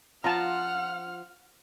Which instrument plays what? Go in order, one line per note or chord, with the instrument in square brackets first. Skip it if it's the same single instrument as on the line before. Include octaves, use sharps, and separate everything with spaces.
[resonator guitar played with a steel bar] F3 F4 [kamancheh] F#5 F6 [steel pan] A5 A#5